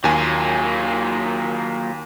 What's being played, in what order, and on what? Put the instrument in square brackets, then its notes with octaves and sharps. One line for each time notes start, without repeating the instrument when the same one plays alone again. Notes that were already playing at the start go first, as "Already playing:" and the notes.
[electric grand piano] D#2 G#5 [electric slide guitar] F#3 A#3 F4